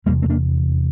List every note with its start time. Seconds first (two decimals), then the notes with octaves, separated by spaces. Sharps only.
0.06 F1 E2 C3 G3 A#3
0.22 A3 C4
0.30 A#3 D4